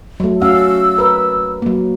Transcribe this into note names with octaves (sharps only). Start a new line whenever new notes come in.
F#3 A3
C#4 F#4 F5 E6
A#4 B4
F#3 A#3